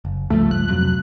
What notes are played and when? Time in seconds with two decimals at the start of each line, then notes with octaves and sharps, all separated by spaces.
0.05 F#1
0.30 C#2 G2 F3 A3
0.51 F#6
0.69 F2 C3 F#3